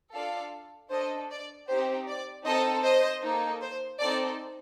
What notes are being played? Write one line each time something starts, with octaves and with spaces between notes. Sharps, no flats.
D4 F4 A4 D5 F5
D4 A4 C5 D#5
D5
C4 D#4 G4 C5
D5
C4 D#4 A4 C5 D#5
C5 D#5
A#3 D#4 A4
C5
C4 D#4 A4 D5